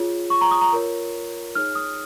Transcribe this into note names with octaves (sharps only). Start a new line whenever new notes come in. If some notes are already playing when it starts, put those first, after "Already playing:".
Already playing: F4 G#4 C#5
C#6
A#5
D#6
A#5
F4 A#4 C#5
D#4 G#4 C#5 F6
D#6